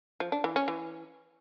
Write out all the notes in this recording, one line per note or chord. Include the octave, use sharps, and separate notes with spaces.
F3
D4
E3
C#4
E3